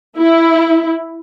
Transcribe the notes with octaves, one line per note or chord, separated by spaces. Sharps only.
E4